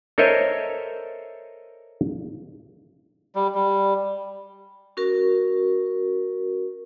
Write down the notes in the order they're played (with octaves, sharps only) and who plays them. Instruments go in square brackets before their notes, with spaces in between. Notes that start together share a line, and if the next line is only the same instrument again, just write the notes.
[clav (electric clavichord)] A4 A#4 C5 C#5 D#5 E5
[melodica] G3
G3
[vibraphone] C#4 F#4 A#4